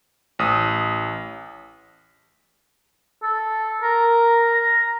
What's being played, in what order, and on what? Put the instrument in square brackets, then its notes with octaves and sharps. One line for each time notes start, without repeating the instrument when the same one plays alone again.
[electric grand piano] A1 D#6
[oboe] A4
A#4
A#5